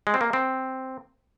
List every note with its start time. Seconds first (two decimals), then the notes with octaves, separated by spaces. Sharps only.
0.07 G#3
0.14 C4
0.21 A#3
0.33 C4